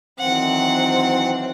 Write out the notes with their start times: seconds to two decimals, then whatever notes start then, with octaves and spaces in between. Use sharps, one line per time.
0.19 D#3 E3 F#3 C4 F#5